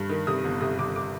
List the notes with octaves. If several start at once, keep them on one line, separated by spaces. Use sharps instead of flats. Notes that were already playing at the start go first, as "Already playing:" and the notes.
Already playing: G2
D#3
C3 D#6
G1
C3 D#6
C3 D6
D6